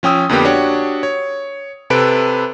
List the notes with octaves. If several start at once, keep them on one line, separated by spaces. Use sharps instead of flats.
F3 C#4 G5 D#6 E6
F2 D3 A#3 B3 G4
D4 F#4 G4 C#5
C#5
C3 A4 B4 B5 D7